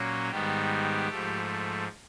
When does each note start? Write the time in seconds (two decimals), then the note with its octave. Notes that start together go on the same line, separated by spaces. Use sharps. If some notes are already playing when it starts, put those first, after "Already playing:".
Already playing: A#2 F#3 A#3 C#4
0.30 G#2 D#3 G3 B3 G4
1.09 G#2 F3 A3